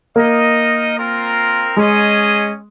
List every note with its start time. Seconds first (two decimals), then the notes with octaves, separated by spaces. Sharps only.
0.16 A#3 D#4 A#4 D#5
0.97 C4 F4 A#4
1.77 G#3 C#4 G#4 D#5